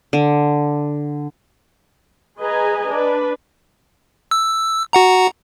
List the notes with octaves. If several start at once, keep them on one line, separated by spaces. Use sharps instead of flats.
D3
G#4 B4 D#5 G#5 A#5
D4 B4
E6
F#4 F#5 A#5